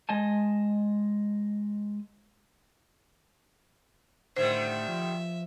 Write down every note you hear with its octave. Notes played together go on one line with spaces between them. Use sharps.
G#3 D#5 G#5 A5
A2 D3 D#3 G3 C5 E5
F3